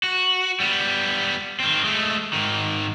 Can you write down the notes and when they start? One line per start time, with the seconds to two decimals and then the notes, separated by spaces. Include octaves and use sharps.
0.03 F#4
0.60 G3 B3
1.60 D#3 C4
1.84 G#3 A3
2.33 G#2 D#3